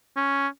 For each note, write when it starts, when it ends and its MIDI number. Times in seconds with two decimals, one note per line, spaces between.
0.17 0.48 61